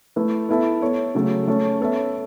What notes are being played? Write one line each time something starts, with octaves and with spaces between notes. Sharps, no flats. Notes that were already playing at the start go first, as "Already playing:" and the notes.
A3 E4 B4 E5
B3 E4 A4 E5
B3 A4 C#5
C#3 F#3 A3
A3 C#4 A4 C#5
B3 A4 C#5 E5